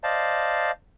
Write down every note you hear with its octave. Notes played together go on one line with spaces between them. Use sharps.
C5 D5 D#5 F5 A5